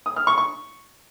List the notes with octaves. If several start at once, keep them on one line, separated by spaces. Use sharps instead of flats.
D#6
F6
C#6
C#6